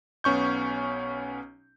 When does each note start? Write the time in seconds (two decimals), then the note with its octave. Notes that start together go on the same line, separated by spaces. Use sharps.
0.24 B1 B3 C#4 C#6 G6